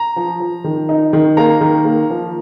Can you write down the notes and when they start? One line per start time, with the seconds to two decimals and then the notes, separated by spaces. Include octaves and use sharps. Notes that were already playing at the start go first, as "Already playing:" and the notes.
Already playing: A#5
0.16 F3
0.40 F3
0.64 D#3
0.89 D#4
1.13 D#3
1.37 A#3 A#5
1.61 D#3
1.85 A#3
2.10 F3